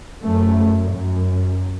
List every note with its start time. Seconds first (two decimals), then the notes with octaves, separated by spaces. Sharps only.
0.23 F#2 A3
0.90 F#2